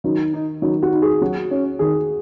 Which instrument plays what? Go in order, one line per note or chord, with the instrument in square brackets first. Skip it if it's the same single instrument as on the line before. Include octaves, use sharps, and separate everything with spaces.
[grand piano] D#3 [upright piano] F#3
[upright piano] D#4
[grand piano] D#3 [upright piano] F#3
[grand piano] F#4
[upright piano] D#4
[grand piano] G#4
[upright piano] F#3 [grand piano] F#4
[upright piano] C#4
[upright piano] D#3 [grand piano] G#4